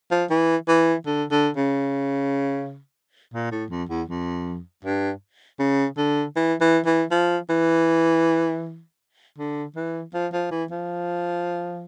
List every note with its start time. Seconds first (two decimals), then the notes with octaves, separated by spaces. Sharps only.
0.11 F3
0.30 E3
0.68 E3
1.06 D3
1.31 D3
1.56 C#3
3.34 A#2
3.52 A2
3.71 F2
3.89 E2
4.08 F2
4.85 G2
5.60 C#3
5.98 D3
6.36 E3
6.61 E3
6.86 E3
7.11 F3
7.50 E3
9.38 D3
9.76 E3
10.14 F3
10.33 F3
10.51 E3
10.71 F3